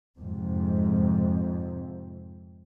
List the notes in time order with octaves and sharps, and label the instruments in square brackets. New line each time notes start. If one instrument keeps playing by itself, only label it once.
[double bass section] F2 G#2 C3